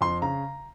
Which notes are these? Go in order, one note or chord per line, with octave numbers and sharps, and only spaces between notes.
F2 C6
C#3 A#5